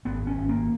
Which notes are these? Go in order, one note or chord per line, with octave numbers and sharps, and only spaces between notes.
G#1 B3
C#4
G#1
A#3